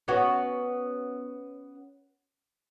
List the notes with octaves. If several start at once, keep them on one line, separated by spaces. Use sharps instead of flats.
B3 C#4 F#4